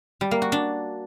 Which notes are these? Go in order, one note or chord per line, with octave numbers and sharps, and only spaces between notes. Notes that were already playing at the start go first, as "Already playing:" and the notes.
G3
A#3
F#4
D4